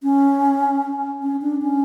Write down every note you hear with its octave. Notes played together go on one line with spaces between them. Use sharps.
C#4
C#4
D4
C#4